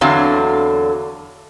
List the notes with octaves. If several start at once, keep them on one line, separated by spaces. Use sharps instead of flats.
E2 D3 F#3 C4 F5